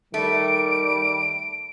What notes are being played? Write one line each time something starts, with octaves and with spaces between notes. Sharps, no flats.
D#3 G3 A3 D7